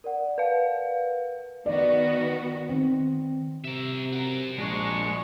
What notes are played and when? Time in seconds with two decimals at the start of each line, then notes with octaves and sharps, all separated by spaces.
0.04 A#4 D5 F#5
0.38 B4 F5
1.66 D#3 B3 F#4 D5
2.69 D#3 C4
3.64 C3 A#4 E5
4.12 F#4 A#4
4.58 A#1 G#3 D4 C#6